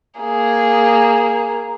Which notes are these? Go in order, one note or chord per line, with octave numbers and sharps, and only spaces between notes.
A#3 G#4